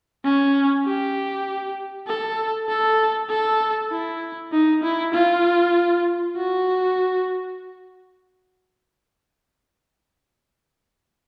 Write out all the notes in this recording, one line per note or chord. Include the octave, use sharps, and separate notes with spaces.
C#4
G4
A4
A4
A4
E4
D#4
E4
F4
F#4